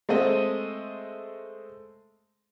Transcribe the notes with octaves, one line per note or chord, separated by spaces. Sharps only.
G#3 A3 C4 D#5